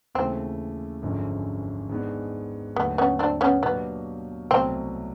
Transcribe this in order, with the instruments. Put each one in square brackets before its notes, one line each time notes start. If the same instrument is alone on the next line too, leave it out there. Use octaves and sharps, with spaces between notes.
[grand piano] D#2 C#3 E3 A3 [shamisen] C4
[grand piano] G#1 F#2 D3 F3 G#3
G#2 D#3 G#3 B3 D4
[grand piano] D#2 D3 F#3 A3 [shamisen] B3
[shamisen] B3 C#4
C4 D4
B3 C#4
[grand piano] B2 F#3 A#3 D4 G4 [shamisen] B3
[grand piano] C2 B2 F#3 A3 [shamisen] C4